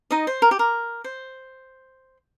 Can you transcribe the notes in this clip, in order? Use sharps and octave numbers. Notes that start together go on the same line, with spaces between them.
D#4 D#5
C5
A#4
G4
A#4
C5